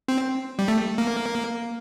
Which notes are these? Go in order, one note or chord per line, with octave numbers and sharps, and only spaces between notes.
C4
G3
A3
A#3